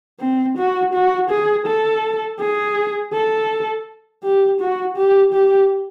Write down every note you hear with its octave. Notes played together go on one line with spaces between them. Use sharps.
C4
F#4
F#4
G#4
A4
G#4
A4
G4
F#4
G4
G4